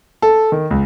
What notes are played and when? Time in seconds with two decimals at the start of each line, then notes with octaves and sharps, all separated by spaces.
0.22 A4
0.52 D#3
0.71 C#2